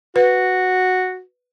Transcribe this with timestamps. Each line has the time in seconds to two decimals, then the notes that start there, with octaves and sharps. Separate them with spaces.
0.16 F#4 B4